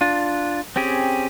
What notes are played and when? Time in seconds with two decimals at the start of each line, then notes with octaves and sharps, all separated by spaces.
0.01 D4 F4
0.76 C4 C#4 G4 G#4